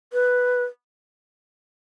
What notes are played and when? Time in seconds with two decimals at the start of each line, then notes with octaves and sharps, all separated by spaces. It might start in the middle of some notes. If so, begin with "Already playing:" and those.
0.13 B4